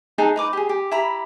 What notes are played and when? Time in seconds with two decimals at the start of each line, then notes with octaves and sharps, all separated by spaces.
0.18 D#4 G#4 A4 F#5
0.36 D#4 B4 D6
0.53 G4 G#4
0.69 G4
0.91 E4 G4 A#5 B5